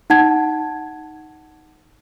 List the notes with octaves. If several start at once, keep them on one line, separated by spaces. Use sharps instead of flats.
D#4 F#5 A5 G#6